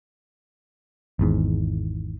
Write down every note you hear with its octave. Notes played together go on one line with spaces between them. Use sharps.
G#1 E2 G#2